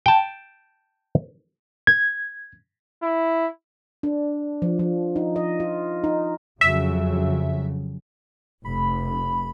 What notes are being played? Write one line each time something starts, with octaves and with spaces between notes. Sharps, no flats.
G5 A5
G#6
E4
D4
F3
F3
D#4
D#5
F4
D#4
F2 C#3 F#3 E5
F1 B5